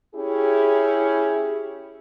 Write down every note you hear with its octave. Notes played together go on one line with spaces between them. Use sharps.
C#4 E4 G4 G#4